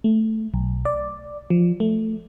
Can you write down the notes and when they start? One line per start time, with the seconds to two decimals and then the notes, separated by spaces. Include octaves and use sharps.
0.04 A3
0.54 B1
0.85 D5
1.50 F3
1.80 A3